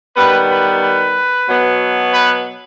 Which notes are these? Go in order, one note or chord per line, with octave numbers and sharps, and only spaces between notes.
D#3 G3 B3 B4
B4
B4
B2 F#3 B3
B4